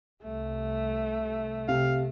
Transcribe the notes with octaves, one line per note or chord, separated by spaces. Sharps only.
C2 A3
C3 F5